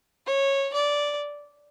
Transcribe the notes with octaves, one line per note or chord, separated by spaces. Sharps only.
C#5
D5